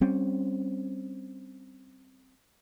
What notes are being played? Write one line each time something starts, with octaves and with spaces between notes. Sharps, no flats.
G3 C4 C#4